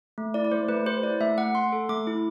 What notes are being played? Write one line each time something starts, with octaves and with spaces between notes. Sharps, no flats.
A3
E4 D5
D5
A3 C5
A3 B4
G4 C5
E4 D5
A3 E5
A3 F#5
A3 C6
A4
A3 D6
E4